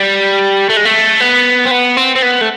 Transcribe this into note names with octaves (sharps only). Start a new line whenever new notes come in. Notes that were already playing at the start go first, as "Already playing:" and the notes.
Already playing: G3
A3
G#3
A3
B3
C4
B3
C4
C4
B3
A3